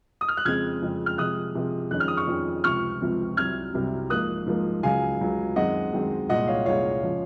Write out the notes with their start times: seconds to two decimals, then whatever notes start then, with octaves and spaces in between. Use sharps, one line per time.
0.21 D#6
0.28 F6
0.37 F#6
0.45 F2 C#3 G#3 C4 F6 G#6
0.82 F2 C#3 G#3 C4
1.06 F6
1.18 C3 F3 G#3 D#6 F#6
1.55 C3 F3 G#3
1.91 F2 D#3 G#3 C#4 F#6
2.00 F6
2.08 D#6
2.17 C#6 F6
2.28 F2 D#3 G#3 C#4
2.64 C#2 C3 F3 C4 C#6 F6
3.02 C#2 C3 F3 C4
3.37 C2 C3 F#3 F6 G#6
3.74 C2 C3 F#3
4.10 G#2 F3 A#3 D#6 F#6
4.47 G#2 F3 A#3
4.83 C#2 C#3 F#3 F5 G#5
5.21 C#2 C#3 F#3
5.56 F#2 D#3 G#3 C4 D#5 F#5
5.93 F#2 D#3 G#3 C4
6.29 C2 A#2 G#3 D#5 F#5
6.47 C#5 F5
6.66 C2 A#2 G#3 C#5 F5
7.02 C#3 F3 G#3